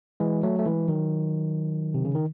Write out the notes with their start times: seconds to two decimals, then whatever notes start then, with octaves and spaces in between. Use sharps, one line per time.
0.20 E3 G#3
0.43 F#3 A3
0.59 A3
0.66 E3 G#3
0.88 D#3 F#3
1.94 C3
2.05 C#3
2.15 D#3